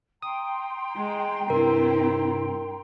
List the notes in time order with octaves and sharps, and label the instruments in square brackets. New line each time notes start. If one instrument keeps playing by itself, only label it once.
[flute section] G5 A#5 C6 [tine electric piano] D#6
[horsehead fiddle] G#3
[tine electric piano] G2 C3 [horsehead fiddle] C4 E4 [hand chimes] A#4